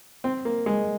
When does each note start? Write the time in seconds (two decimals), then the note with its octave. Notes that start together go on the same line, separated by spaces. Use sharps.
0.24 C4
0.45 A#3
0.66 G#3